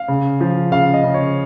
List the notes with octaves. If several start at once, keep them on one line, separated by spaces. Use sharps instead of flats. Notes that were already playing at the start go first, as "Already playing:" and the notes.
Already playing: F5
C#3
F3
C#3 F5
D#5
C#3
C#5